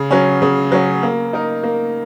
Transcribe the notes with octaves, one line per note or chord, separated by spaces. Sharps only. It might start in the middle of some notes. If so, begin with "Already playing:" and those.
Already playing: C#3
F#3 C#4
C#3
F#3 C#4
A#3
D#4 A#4
A#3